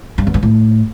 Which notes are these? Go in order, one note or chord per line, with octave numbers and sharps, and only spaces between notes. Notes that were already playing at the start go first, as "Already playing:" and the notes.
G2
E2
G2
A2